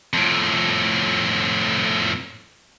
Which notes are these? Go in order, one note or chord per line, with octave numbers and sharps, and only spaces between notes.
F2 A2